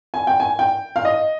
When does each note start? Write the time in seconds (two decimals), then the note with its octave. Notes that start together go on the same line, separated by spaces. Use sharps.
0.14 G#5
0.27 G5
0.40 G#5
0.59 G5
0.96 F5
1.05 D#5